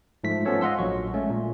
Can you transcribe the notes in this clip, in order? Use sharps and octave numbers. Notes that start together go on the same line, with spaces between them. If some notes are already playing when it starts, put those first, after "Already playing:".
G#2 F3 A3 B6
F3 G#3 B3 C#4 A4 C#5
D#5 F5 F#5 C6 E6
A#1 A#2 F#3 C#6
G#3 A3 C#4
A#2